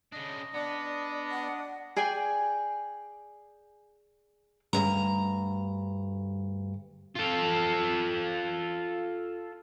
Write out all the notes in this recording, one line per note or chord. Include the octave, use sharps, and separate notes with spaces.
C#3 D4 D#5
B3 D4 D5
F#5
G#4 D5 G5 G#5
D2 G2 A#5
F4 A4